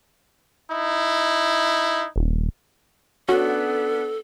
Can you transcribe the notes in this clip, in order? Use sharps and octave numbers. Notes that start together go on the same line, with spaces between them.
D#4 E4
D#1
B3 C#4 D4 F#4 A4